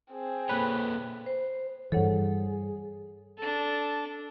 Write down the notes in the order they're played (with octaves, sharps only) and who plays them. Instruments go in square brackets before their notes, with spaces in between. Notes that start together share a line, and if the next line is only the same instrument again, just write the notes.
[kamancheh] C4 G#4
[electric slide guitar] A#3 A4 C#5 [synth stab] B4
[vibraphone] C5
[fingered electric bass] G2 E3 [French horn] G#4 [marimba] A4 C#5 F#5
[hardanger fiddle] D4 A4